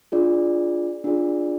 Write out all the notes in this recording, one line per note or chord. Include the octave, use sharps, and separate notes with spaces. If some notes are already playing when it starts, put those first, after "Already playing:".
D4 F4 G#4 D5
D4 F4 G#4 D5